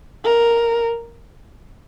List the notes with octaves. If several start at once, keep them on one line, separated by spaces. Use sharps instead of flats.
A#4